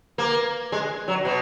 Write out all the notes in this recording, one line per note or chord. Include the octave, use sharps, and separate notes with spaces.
A#3
G#3
F#3
B2